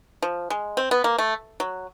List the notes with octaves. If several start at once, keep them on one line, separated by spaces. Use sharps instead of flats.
F3
G#3
C4
B3
A#3
A3
F#3